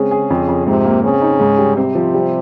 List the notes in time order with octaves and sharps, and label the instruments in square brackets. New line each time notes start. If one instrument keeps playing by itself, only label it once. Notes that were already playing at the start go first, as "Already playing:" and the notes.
Already playing: [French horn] C#3 [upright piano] G#3 C4
[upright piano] G#4
F2
F2
[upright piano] G#2 [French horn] C3
[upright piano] A#3
[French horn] C#3 [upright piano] C4
[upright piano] D#4
G#2
G3
[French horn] C3 [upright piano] C4
[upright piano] F3
G3